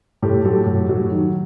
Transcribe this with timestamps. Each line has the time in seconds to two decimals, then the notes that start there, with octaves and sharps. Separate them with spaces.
0.22 A2 G4 A4
0.45 F#3 G4 A4
0.66 A2
0.89 F#3
1.11 D#3